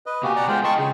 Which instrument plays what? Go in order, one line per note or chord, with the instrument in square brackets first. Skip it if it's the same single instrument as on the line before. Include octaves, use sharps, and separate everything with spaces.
[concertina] B4 D#5
[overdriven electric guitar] B2 G#5 [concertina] A#3 F#4 G4
[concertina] D5 F#5 A#5
[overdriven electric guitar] G#3 B3 [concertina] F4 C5 G5
[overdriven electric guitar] D#5 G5 [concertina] A5 C6 C#6
[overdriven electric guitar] C#3 [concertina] G#4